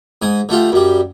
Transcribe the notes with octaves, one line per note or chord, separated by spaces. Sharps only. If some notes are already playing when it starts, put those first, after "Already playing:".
G#2 G#5 D#6
D3 A3 F4 G4
F#2 G3